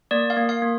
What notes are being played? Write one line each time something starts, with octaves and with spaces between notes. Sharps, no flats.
A#3 D5
F5
A#3
F5
A#3